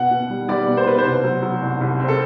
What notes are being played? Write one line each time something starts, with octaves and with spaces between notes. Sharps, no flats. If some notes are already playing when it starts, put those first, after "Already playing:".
Already playing: B2 F#5
B2
G3
G3 D5
B2
C5
B2 B4
C5
C2
F#3
F#3
C2
C2
C4
A4